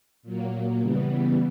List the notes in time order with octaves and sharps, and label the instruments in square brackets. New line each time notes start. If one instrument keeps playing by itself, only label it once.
[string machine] A#2 F#3 A#3
C#3 E3 G3 B3